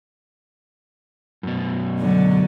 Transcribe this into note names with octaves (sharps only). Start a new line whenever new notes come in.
F#2 B2
D3 F#3